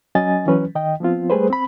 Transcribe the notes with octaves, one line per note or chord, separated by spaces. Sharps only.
F#3 C#4 D#5 G#5 A6
E3 F#3 C#4 B4
D#3 D#5 G5
F3 B3 C4 F4
G3 A3 G#4 B4 C5
C4 B5